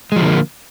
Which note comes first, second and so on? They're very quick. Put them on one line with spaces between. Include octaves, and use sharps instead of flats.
G#3 F3 D3 A#3